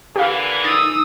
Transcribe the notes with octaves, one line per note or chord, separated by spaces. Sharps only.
A#2 D3 E3 G4 F5
D#4 D#6 E6 A6